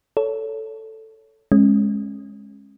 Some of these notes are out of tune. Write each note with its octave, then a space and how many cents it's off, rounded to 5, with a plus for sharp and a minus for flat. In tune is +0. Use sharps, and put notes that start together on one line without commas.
A4 +5 C#5 +15
G#3 +0 C#4 -25